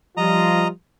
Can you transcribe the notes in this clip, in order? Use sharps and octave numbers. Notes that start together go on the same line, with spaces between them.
F3 G3 F4 D#5 A#5